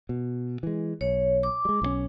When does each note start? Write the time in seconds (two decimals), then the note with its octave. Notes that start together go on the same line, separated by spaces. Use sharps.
0.09 B2
0.63 E3 G#3
1.01 B1 C#5
1.43 D6
1.65 G3 G#3
1.82 B1 E3 C#4